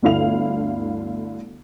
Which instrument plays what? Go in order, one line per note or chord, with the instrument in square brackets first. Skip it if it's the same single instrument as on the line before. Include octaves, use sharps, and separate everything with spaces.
[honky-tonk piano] G1 D2 D3 E4 F5 F7